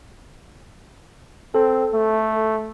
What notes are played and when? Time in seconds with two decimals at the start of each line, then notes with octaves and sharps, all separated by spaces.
1.55 C4 A4
1.94 A3